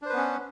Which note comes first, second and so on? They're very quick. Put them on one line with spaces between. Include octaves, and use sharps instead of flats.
D4 C5 B4 B3 C#4